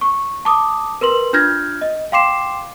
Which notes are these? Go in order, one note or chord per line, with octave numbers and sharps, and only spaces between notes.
C#6
A5 D6 D#6
A#4 B4 C6 F#7
D4 F4 F6 G6 G#6 A#6
D#5
F5 G5 C6 D6 C7 E7